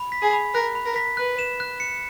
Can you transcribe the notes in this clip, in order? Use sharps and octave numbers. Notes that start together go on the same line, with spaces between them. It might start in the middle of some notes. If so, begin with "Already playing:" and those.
Already playing: B5
B6
G#4
B5
A#4 F#6
B5
A#4
B6
B4 F#6
E7
F#6
C#7